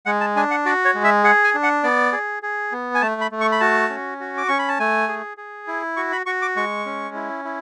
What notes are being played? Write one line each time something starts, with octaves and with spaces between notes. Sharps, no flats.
G#3 F#5
A5
D4 G#5
F#5
F#4 D5
C#5
G#3
E5
G#4 F#5
G#5
D4
F#5
B3 D5
G#4
G#4
B3
G#5
A3 A5
B5
A3
C#6
B5
F#4 A5
C#4
F#4
D6
C#4 C#6
B5
A5
A3 G#5
G#4
G#4
E4
F#4 C#6
B5
F#4 C#6
D6
G#3 C#6
C#4
E4
E4